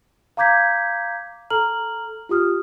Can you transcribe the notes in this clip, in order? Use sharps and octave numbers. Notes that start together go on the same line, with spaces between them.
F5 A#5 D6 G6 G#6 B6
A4 A#5 F6 F#7
F4 G4 D#6 F6